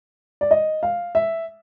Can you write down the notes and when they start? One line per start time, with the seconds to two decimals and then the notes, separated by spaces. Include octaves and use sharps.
0.41 D5
0.51 D#5
0.83 F5
1.15 E5